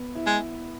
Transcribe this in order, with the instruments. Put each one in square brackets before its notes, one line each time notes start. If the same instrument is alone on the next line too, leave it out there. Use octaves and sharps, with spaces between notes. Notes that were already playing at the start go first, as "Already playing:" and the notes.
Already playing: [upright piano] B3
E4
[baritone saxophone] G#3